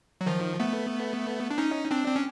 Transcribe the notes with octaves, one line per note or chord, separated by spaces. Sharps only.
F#3
D#3 F3
A3 B3
D4
C#4 D#4
C4 D4
C4
C#4